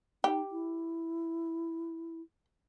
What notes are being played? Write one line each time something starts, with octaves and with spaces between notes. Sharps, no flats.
D#4 G4
E4